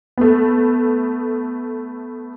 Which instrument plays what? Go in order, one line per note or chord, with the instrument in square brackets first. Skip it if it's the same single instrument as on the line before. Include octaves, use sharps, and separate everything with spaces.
[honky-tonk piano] A3 B3